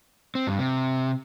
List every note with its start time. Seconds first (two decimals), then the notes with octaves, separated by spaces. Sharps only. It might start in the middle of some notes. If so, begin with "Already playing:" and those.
0.35 C4
0.47 G2
0.59 C3